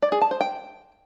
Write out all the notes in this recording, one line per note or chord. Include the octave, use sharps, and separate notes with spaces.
D5
G#4
A5
C5
G5